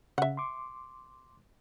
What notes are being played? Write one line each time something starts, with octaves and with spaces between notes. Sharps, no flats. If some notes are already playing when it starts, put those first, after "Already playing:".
C#3 E5 F#5
C6 D6